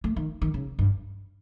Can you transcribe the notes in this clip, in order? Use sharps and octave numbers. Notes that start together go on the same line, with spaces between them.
A3
D#3
D#3
C#3
G2